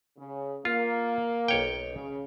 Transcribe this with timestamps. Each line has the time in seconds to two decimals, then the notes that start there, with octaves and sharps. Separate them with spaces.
0.18 C#3
0.65 A#3 F4
1.48 B1 C#5 G5
1.91 C#3